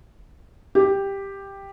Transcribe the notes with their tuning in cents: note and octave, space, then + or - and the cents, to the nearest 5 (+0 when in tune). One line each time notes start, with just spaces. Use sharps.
G4 +5